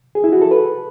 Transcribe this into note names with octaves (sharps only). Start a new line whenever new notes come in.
G#4
E4
F#4
A4
B4